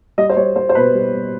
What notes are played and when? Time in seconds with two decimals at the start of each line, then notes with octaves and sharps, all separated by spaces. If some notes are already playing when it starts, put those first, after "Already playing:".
0.18 G3 D#5
0.29 C5
0.37 G3 C#5
0.56 G3 C5
0.69 C5
0.75 B2 B4
0.95 G3
1.13 G3